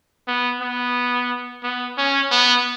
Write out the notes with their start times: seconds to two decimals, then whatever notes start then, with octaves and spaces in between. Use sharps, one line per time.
0.28 B3
0.61 B3
1.63 B3
1.98 C#4
2.31 B3